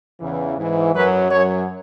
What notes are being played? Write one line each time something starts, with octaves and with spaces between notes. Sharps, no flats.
E2 C#3 E3
G#2 E3
F#2 F#3 B4
F#2 F#3 C#5